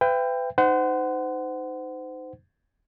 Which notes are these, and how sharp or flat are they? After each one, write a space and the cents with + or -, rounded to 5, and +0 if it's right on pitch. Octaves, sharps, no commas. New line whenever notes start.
B4 +35 E5 +40 G5 +15
D#4 -5 C5 -30 F#5 +15